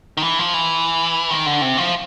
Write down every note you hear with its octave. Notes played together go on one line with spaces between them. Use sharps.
D#3
E3
F3
E3
D#3
D3
C3
F3